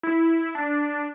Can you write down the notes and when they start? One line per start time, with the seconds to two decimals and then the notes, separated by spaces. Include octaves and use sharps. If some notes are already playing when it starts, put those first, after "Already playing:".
0.03 E4
0.55 D4